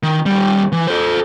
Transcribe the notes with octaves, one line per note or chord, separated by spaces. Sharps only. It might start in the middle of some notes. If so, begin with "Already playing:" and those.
D#3
D#2 G3
E3
A4 C5